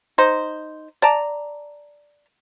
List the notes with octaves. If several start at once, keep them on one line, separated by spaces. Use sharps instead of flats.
D#4 C5
D5 A5 A#5